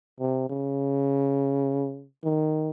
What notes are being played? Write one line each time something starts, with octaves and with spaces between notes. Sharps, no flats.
C3
C#3
D#3